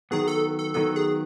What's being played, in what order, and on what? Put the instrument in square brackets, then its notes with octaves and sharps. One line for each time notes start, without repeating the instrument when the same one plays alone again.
[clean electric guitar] D#3 F#3 B3 [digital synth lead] G#4
[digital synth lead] A4
A4
[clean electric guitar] D#3 F#3 B3 [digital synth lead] A4
[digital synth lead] G#4